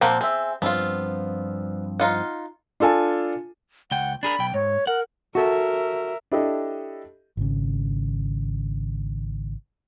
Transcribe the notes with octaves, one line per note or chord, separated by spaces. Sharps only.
A#2 F3 A#3 C4 C5 F#5
C4 G#4 E5
G2 F3 B3 C4 F4
D#4 F4 F#5
D4 F4 A4 G#5 A5
C#2 F#5 G5
D4 G#4 A#4 B5
B1 G5
G#2 C#5
A#4 F#5
F#4 A4 A#4 E5
D4 E4 G4 A4 D#5
G#1 C#3